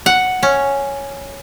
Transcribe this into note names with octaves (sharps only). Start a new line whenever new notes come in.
F#5
C#4